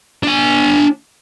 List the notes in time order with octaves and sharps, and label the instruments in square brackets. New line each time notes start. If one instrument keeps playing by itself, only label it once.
[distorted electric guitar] D4 G#5